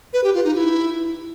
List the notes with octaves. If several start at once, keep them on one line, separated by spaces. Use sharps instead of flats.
B4
G4
F4
D#4
E4